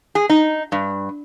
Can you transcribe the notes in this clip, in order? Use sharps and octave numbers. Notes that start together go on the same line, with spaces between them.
G#4
D#4
G2